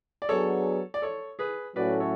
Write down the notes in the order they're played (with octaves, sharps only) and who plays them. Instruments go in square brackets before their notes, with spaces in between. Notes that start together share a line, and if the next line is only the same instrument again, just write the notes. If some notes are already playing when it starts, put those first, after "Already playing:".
[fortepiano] D5
[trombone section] F#3 B3 D4 G#4 [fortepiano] A4 C#5
[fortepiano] D5
A4 C#5
G#4 B4
[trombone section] A2 F#3 A3 C#4 F#4 [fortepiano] B4 D5
[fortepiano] A4 C#5